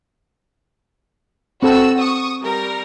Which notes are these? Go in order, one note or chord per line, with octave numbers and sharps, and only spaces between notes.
C4 F#4 A4 E6
C#6 D#6
G3 A#4